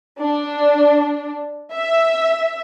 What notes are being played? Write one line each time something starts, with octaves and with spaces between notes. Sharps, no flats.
D4
E5